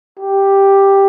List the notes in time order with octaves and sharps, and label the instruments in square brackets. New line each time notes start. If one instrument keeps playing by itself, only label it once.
[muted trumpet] G4